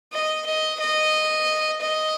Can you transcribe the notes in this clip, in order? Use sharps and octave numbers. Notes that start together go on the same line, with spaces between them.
D#5
D#5
D#5
D#5